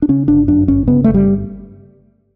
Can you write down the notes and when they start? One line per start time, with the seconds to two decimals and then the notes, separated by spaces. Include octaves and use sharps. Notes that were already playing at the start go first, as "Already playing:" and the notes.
0.02 D4
0.09 C#3 C#4
0.28 G1 D4
0.48 F#2 D4
0.68 G1 C#4
0.88 C#3 B3
1.04 G1 A3
1.14 G3